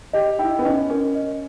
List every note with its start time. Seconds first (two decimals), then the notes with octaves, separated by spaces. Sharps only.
0.13 G4 D#5
0.39 E4 G5
0.59 B3
0.65 C#4 D#5
0.90 C#4 A#4
1.15 D#5